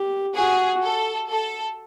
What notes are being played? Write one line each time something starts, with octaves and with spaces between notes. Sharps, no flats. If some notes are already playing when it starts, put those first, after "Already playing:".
Already playing: G4
F#4 G#4
A4
A4